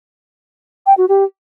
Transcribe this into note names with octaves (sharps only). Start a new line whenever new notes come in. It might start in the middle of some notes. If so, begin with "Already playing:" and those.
G5
F#4
G4